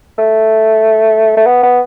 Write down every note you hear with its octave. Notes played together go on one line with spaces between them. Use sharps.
A3
A3
B3
B3